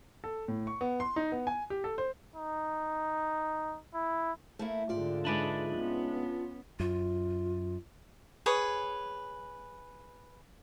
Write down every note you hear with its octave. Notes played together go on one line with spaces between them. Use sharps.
A4
A2
C#6
B3
C6
D#4
B3
G#5
G4
A4
C5
D#4
E4
A3 A#3 E4
G#2 D3 F4 G4 D5
G#3 D4 D#4 B4 D5 E5
B3 C#4
F#2 F4
G#4 B4 C#5